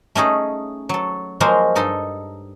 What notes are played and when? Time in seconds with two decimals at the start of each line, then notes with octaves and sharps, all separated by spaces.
0.15 A3 C#4 D#4 G#4
0.89 F#3 A4
1.40 F3 F#3 G#3 A#3 A#4 C5
1.75 G2 D#4 A4 C6